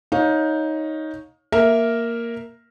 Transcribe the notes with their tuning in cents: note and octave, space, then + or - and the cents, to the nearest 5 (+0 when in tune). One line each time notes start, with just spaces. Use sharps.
D#4 +10 C#5 +0 F5 +30
A#3 +0 A#4 +0 E5 +0